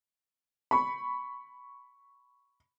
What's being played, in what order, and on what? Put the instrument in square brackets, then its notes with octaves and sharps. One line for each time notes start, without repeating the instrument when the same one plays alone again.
[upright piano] B5 C#6